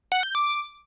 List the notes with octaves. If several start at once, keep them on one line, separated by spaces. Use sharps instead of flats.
F#5
G6
D6